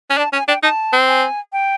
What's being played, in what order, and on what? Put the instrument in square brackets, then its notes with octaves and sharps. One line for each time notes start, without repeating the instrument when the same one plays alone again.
[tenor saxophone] C#4
[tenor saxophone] D4 [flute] A5
[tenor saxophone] C#4 [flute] G#5
[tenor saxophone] D4 [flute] G5
[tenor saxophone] D#4 [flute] A5
[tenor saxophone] C4
[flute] G#5
G5